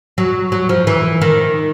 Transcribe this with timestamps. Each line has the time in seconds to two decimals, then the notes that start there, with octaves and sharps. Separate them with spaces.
0.18 F#3
0.52 F#3
0.69 F3
0.87 E3
1.21 D#3